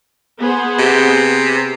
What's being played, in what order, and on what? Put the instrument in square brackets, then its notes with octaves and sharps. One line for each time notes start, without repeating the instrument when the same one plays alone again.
[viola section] B3 G#4 C5
[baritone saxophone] C3